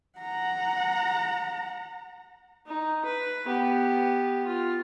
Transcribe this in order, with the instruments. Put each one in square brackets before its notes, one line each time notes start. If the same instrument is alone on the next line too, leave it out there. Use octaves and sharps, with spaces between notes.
[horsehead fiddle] F#5 A#5
[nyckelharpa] D#4
B4
B3 G4
F4